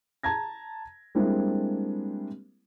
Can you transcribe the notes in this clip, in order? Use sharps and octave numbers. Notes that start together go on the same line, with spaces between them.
A5 A#5 G#6 A#6
G3 G#3 A#3 C4 D4 E4